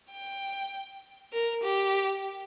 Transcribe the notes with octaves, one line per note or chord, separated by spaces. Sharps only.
G5
A#4
G4